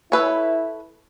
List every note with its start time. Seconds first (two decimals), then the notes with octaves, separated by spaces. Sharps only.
0.12 E4 A4 B4 C#5